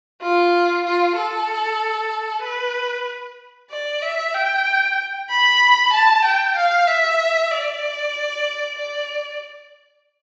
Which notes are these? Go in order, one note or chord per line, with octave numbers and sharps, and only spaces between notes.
F4
F4
A4
B4
D5
E5
G5
B5
A5
G5
F5
E5
D5
D5